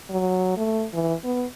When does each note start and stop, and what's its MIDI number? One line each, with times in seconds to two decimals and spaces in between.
0.10 0.53 54
0.57 0.85 57
0.93 1.14 52
1.24 1.45 59